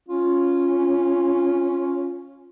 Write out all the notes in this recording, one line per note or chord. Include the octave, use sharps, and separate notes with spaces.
C#4 F4